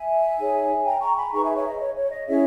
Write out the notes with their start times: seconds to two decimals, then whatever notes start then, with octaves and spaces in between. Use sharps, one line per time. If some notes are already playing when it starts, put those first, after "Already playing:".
Already playing: E5 G#5
0.38 D#4 G#4 C#5
0.85 G5 A#5
1.01 A#5 C#6
1.17 G#5 B5
1.32 D#4 G#4 B4 A#5 C#6
1.44 E5 G#5
1.56 C#5 E5
1.67 D#5
1.80 C#5
1.95 C#5
2.11 D#5
2.27 C#4 E4 G#4 C#5 E5